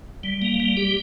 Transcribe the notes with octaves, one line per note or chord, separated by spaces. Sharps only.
G3
A#3
G3
G4